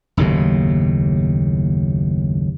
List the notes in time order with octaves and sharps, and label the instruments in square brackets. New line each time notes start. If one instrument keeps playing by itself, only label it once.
[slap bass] F#1 D#2 A2 C3